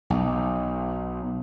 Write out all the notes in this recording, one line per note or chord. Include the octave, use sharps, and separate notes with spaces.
B1